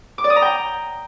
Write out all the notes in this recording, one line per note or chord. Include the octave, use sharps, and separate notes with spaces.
D6
D5
D#6
A#5
G5